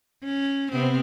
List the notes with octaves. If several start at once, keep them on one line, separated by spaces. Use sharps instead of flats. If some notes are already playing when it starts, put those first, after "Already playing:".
C#4
C3 B3 C4